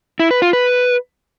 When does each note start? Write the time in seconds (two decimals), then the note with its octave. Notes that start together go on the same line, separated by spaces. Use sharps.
0.19 E4
0.31 B4
0.42 F4
0.53 B4